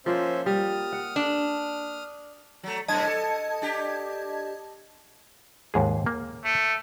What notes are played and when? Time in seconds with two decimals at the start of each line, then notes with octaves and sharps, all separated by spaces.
0.06 F3 A#3 C#4 C5 E5
0.46 G3 D#6 F6
0.93 F#5
1.16 D4
2.63 F#3 A3
2.88 F#2 A2 C3 D#5 A5 G#6
3.07 A4
3.62 D4 G4
5.74 D#2 G#2 G#4
6.06 A#3
6.44 A3